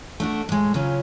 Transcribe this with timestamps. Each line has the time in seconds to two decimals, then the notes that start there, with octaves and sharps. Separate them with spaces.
0.20 A3 D4 F#4
0.49 A2 G#3
0.74 C#3 F#3 C#4 F4